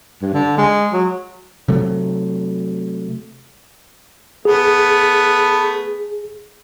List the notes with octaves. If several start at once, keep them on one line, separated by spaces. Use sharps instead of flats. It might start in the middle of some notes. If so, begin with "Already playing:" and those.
G2
D3
G#3
F#3
C3 F#3 A3
A3 B3 G#4